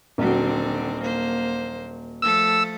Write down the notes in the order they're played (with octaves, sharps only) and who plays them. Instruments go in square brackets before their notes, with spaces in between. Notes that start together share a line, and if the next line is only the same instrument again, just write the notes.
[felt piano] D#1 F#3 [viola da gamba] D3 C4
[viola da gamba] A#3 C5
[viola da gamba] F3 A3 A4 [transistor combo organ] E6